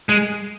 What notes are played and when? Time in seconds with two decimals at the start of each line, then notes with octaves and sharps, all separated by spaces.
0.09 G#3